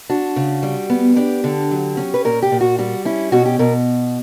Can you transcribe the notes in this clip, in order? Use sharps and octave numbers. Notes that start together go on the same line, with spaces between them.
D4 F#4
C#3
G3
B3
D4 G4
D3
F#3
C#4
B4
A#2 A#4
G4
A#2
F#4
G3 F#4
C#4 E4
B2 F#4
G4
B2 A#4